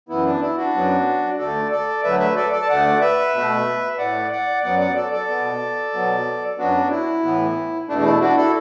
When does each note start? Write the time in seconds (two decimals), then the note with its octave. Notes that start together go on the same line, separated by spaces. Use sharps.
0.09 F#2 E3 B3 E4
0.26 D4
0.41 E4
0.57 D4 F#4
0.74 F#2 F#3 B3
1.38 D2 D3 A3 A4 D5
1.71 A4 D5
2.03 D2 D3 F#3 A3 B4 E5
2.20 B4 E5
2.36 A4 D5
2.52 A4 D5
2.62 A5
2.69 D2 D3 A3 D5 F#5
3.01 B4 E5
3.34 B2 A3
3.98 A2 A3 D5 F#5
4.31 D5 F#5
4.63 F#2 F#3 B3 D5 F#5
4.79 D5 F#5
4.95 A4 D5
5.12 A4 D5
5.28 B2 B3
5.94 B2 F#3 B3
6.58 F#2 F#3 B3 D4 F#4
6.90 E4
7.23 A2 E3 B3
7.88 E2 B2 A3 D4
7.98 D4
8.04 E4
8.21 D4 F#4
8.36 E4 A4